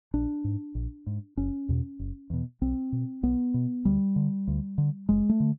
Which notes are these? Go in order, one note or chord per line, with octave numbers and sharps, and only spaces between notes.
A#1 D4
G#2
A#1
G#2
F#1 C#4
E2 B2
F#1
E2 B2
B1 C4
B2
B1 B3
B2
D2 G3
D3
D2
D3
F#1 G#3
A3
D3